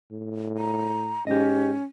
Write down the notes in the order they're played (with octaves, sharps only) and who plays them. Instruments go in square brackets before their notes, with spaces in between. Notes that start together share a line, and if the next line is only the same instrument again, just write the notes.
[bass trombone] A2
[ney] A#5
[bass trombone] G#2 [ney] C#4 [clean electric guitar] G4 D#5